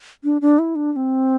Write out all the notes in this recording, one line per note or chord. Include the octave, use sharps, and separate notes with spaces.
D4
D4
E4
D4
D4
C4